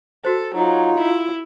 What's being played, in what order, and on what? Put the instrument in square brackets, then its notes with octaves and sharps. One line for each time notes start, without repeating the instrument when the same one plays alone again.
[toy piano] F#4 C5 [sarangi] A4
[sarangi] F#3 [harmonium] D#4 [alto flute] F4
[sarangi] E4